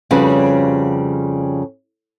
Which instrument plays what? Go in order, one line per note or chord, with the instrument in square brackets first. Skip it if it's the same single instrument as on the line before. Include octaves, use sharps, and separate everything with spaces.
[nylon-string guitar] F2 C#3 G3 C#4 F#4 B4